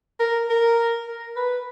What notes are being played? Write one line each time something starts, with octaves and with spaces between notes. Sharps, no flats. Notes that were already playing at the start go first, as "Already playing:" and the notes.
A#4
A#4
A#4
B4